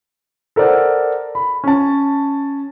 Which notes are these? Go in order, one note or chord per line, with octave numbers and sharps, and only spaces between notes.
A4 A#4 C5 D5 F#5
B5
C#4 A5